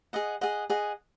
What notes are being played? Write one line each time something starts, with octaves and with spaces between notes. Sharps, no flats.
G#4 D#5 F#5
G#4 D#5 F#5
G#4 D#5 F#5